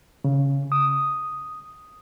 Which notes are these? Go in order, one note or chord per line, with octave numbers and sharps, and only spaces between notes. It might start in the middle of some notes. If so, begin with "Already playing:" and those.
C#3
D#6